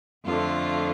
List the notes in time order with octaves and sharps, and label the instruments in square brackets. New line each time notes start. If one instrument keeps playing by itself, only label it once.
[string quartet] F2 D3 A3 F4